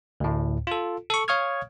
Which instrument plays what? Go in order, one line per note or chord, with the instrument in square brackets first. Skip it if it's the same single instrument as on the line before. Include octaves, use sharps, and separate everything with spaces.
[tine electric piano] D2 A2
F4 A4
A4 C#6
C#5 F5 C#6 D#6 F6 G#6